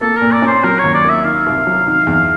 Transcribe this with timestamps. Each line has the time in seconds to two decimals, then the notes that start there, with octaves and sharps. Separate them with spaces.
0.01 A#3 A4
0.16 A#4
0.22 A#2
0.33 D5
0.42 C#4
0.47 C5
0.64 F#3 A#4
0.79 D#2 C#5
0.94 D5
1.05 A#3 E5
1.25 D#3 F5
1.46 C2
1.67 F#3
1.87 D#3
2.07 E2